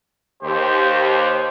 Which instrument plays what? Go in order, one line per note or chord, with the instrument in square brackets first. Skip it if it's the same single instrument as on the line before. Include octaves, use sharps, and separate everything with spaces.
[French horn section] D#2 [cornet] G4 [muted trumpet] C5